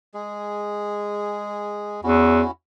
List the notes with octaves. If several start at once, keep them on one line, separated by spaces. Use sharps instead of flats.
G#3 G#4
E2 C#4 E4 F#4